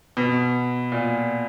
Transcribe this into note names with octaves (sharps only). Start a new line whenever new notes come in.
B2
A#2